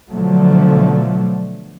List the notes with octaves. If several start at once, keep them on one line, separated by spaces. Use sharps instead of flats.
B2 D3 F3 F#3 A3